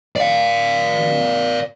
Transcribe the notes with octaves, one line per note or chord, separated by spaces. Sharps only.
D5 F5